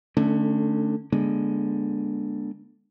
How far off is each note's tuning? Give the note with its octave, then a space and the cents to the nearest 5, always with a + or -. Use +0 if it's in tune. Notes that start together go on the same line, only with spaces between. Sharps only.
D3 +20 A3 +0 C#4 +0
D3 +0 G#3 +0 B3 -45